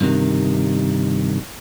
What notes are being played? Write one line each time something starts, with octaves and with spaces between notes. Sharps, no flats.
G2 C3 D#3